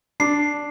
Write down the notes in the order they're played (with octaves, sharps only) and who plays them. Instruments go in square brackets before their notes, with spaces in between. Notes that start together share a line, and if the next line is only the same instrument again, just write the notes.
[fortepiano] D4 [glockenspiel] C7